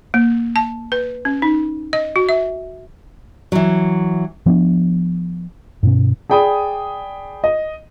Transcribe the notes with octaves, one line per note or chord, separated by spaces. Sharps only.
A#3
A5
B4
C#4
D#4
D#5
F#4
E5
E3 F#3
F3 B3 C#4 D4
G2 B2 C#4
G#4 D5 G5 B5 D#6
D#5